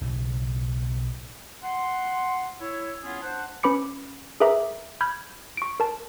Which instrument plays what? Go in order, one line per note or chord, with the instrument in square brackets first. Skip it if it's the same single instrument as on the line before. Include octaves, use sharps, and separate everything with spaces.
[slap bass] B1 A2 C#3
[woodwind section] F#5 C6
E4 C#5 E6
B3 C#4 E4 F4 G#4 C#5
D4 C5 F#5
[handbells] C#4 B4 B5 D6 C#7
G#4 A#4 B4 E5 A#5 D6
B5 F6 G6 G#6
C#6 D7
A#4 A5